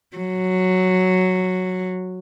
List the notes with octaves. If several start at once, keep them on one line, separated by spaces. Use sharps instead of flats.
F#3